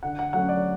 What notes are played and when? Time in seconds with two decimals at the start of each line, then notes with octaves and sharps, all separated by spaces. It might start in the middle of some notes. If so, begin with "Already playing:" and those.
0.03 D3 F#5
0.19 F#5
0.33 F#3 A3 C#4 F#5
0.49 D5